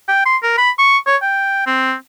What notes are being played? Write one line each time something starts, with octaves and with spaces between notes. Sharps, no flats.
G5
C6
A#4
B5
C#6
C#5
G5
C4